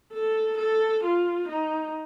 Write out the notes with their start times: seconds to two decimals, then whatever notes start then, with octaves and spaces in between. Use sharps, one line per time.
0.13 A4
0.58 A4
1.03 F4
1.48 D#4